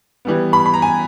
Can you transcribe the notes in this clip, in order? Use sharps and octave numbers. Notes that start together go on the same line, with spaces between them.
E3 G3 B3
B5
B5
A#5
G#5